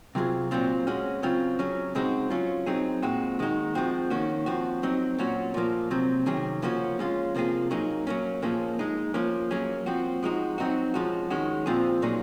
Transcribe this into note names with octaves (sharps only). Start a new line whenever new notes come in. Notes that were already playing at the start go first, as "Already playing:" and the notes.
C3 F#3 C4 F4 G#4
A#2 F#3 C4 F4
G#3 C#4 F#4
C#3 F#3 C4 F4
F#3 C#4 G#4
C#3 G#3 C4 D#4 F#4
F#3 C#4 F4
F#3 C4 D#4 G#4
A#2 G#3 C4 F#4
D#3 G#3 D#4 F#4
F3 G#3 C4 F#4
D#3 A#3 C#4 F#4
F3 C4 F#4
F#3 C4 D#4
A#2 F#3 C#4 F#4
A#2 F3 A#3
C3 F#3 C4
C3 D#3 F#3 C#4 G#4
C#3 F3 A#3 C#4 F#4
G#3 C#4 F4
C3 F3 A#3 F4 G#4
F#3 A#3 D#4 G#4
F#3 A#3 C#4
A#2 F3 A#3 C#4 G#4
G#3 D#4 G#4
F3 A#3 C#4
F#3 A#3 C#4 G#4
F3 C4 F#4
F3 G#3 D#4 F#4
F#3 C4 D#4 F#4
F3 G#3 C#4 F#4
D#3 G#3 C#4 F#4
A#2 F3 C4 F4 G#4
A#2 F#3 A#3 D#4 G#4